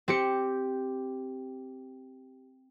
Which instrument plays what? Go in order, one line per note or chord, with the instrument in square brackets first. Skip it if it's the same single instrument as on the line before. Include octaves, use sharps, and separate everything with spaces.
[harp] C4 G4 C#7